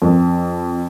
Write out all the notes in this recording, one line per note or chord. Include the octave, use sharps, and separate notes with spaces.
F2